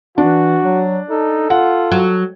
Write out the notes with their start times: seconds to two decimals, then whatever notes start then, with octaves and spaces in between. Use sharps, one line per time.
0.18 E3 D4 F#4
0.64 F#3
1.10 D#4 A4
1.50 F4 F#5
1.92 F#3